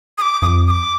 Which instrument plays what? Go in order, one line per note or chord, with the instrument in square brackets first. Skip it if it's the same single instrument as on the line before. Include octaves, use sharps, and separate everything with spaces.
[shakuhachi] D#6
D6
[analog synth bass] F2 [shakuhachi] D6 D#6
[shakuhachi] D#6
D6